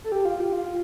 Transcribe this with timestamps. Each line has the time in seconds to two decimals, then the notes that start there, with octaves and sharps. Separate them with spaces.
0.04 A4
0.12 G4
0.25 F4
0.40 G4
0.53 F4